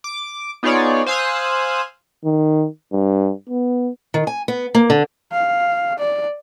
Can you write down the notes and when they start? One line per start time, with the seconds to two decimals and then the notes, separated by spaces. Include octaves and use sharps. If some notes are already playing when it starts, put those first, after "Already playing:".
0.04 D6
0.63 B3 D#4 F4 G#4 C#5 D5
1.06 C5 F5 G#5 D#6 E6 F#6
2.25 D#3
2.92 G2
3.49 B3
4.14 D#3
4.27 G#5
4.48 B3
4.75 A#3
4.90 D3
5.33 F5
5.99 D5